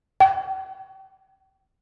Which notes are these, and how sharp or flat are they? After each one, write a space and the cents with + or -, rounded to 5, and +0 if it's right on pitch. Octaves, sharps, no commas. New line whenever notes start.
G5 -30